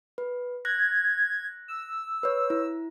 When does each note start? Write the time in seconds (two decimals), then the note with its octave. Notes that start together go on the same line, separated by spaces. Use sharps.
0.18 B4
0.65 F#6 G#6 A#6
1.68 E6
2.23 B4 C#5
2.50 E4